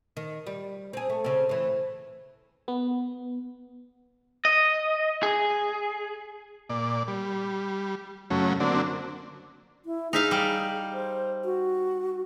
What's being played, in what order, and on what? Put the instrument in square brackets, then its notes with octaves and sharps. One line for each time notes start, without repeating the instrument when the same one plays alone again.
[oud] D#3
G3
C4 G#4
A3
C#3 C4
A2 E3
[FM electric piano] B3
[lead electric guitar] D#5
G#4
[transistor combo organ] A#2 D5
G3
F#2 C#3 F#3 A3 C#4
D3 F#3 A#3 C4 D4
[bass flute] E4
[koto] D#4 E5 F5 [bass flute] G#4
[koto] G3
[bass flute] C5
F#4